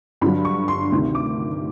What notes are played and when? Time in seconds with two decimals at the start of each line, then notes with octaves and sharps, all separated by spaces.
0.21 G2 D3 F#3 B5
0.45 C#6
0.68 C6
0.92 D2 C3 D#3
1.15 D6